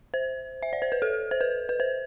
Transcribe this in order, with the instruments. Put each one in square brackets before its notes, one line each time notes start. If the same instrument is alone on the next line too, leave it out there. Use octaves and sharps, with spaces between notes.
[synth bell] C5
E5
D5
C5
B4
A4
C5
B4
B4
C5